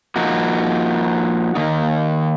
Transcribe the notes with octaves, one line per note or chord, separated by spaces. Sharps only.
F3 A#3 D#4 F#4
D#3 A#3 D#4